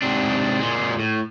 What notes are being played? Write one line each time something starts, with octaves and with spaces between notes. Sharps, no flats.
G#2 C3 C4 D4
A#2 G#3
A2